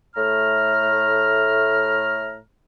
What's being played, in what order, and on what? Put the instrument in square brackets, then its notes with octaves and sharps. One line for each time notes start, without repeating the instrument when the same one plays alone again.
[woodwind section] A2 A3 A#5 F6